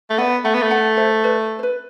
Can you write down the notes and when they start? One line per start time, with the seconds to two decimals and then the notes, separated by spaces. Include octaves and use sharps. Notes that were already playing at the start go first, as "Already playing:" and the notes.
0.10 A3
0.18 B3 D5 F#5
0.45 A3 F#5 A5
0.54 B3
0.62 A3
0.71 F#5 A5
0.97 C5 E5
1.24 B4 D5
1.59 C5
1.63 B4